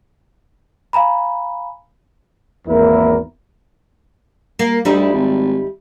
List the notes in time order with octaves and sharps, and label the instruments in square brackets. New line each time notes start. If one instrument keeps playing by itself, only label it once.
[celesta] F5 G#5 A#5 B5
[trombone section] G#1 E2 A#3 E4 A#4 B4
[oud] A#3
[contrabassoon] D2 [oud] G3 D#4 E4
[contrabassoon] G#1